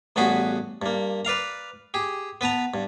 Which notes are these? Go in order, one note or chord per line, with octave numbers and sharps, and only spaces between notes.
A1 G2 B3 F#4 G#4 B5
G2 A#3
B4 D5 F5 A#5
G4 G#4
B3 B4 A5 A#5
G2